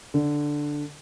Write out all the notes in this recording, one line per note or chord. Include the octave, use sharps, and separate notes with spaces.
D3